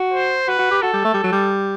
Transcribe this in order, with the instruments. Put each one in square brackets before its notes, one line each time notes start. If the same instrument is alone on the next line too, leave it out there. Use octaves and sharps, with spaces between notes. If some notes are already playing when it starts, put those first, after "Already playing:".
Already playing: [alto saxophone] F#4
[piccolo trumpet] C5
[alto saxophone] F#4 [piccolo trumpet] B4
[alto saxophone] F#4
G4
[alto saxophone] F#4 [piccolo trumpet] A4
[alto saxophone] G3
A3
G3
F#3
G3